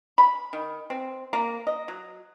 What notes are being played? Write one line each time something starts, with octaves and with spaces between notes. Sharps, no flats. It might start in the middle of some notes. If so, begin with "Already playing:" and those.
B5
D#3
C4
A#3
D#5
F#3